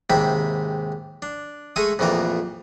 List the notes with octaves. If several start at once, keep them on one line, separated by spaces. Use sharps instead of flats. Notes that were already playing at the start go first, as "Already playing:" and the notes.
D#2 G#2 C3 E5 G5 B5
D4
G#3 A3 A4 G#5 C#6 D#6
A#1 F2 E3 A3 A#3 D6